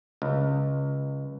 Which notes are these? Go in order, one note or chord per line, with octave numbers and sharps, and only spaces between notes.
C#2